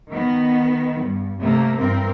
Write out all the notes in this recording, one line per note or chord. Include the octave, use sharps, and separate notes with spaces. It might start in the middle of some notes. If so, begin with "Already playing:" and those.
D#3 B3
G2
C3 A3 A#3
G2 E3 C4 A#4